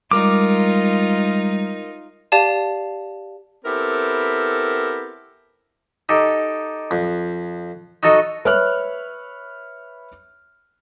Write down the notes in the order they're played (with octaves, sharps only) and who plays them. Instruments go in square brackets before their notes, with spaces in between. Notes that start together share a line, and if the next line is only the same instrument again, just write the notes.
[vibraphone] G3 G#3 [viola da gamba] D#4 F4 [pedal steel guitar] A#4 D6
[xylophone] G4 D5 F5 A5
[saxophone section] B3 C4 E4 G4 A4 A#4
[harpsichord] D#4 G4 A4
F2
D#4 F#4 A4 C#5 D#5
[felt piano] B4 C#5 E5 F6 F#6